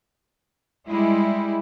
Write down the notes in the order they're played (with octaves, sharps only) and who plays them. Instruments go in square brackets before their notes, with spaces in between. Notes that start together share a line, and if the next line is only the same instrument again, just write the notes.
[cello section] G3 G#3 E4